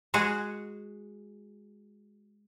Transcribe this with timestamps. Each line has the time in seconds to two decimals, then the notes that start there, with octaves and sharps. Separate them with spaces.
0.14 G#3 F#4 G#4